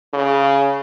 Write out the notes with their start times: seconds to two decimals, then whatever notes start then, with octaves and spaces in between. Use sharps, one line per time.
0.14 C#3